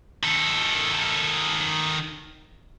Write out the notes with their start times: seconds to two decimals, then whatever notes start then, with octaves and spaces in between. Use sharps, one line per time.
0.23 D#3 A4